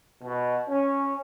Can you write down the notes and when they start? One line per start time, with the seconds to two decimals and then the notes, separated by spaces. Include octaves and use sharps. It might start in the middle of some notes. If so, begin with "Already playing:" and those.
0.22 B2
0.69 C#4